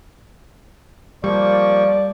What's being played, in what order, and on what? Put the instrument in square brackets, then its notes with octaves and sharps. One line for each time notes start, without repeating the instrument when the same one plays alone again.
[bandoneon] F3 A#3 C#6 [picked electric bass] G3 [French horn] D5